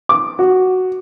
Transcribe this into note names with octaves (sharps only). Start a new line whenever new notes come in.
D6
F#4